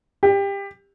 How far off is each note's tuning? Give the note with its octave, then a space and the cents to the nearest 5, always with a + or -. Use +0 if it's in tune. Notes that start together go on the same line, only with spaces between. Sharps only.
G4 +20